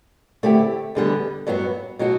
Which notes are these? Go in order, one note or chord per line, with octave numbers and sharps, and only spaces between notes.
D3 A3 C4 E4 G4
E2 D3 G3 B3
G2 F#3 B3 F#4
B2 F#3 B3 F#4